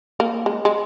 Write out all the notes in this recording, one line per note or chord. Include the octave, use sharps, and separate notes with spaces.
A#3
G#3
G#3